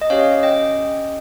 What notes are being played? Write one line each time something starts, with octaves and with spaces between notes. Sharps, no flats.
D#5
C#4 G4 C#5 F5
D#5 G5